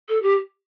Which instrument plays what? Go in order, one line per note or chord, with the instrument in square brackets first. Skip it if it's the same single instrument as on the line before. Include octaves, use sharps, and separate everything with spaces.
[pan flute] A4
G4